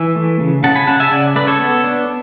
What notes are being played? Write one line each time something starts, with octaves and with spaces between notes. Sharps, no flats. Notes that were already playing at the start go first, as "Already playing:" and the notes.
Already playing: E3 E5 G#5
A3
C#3
C#3 F#5 A5
G#5 B5
C#3 F#5 A5
E5 G#5
C#3 D5 F#5
A3 B4 D5
A4 C#5
B3
D4